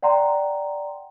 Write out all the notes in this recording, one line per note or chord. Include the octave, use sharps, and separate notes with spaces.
D5 F#5 G5 A#5 C6